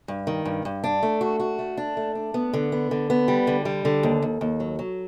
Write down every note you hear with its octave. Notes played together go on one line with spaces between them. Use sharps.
G2
D#3
G2
G2
D4
A3
F#4
F#4
A3
D4
A3
D4
B3
D3
B3
D3
B3
G3
D3
G3
D3
D#2
D#2
D#2
F#3
F#3